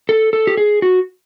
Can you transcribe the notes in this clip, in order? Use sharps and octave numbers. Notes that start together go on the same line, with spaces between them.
A4
A4
G4
G#4
F#4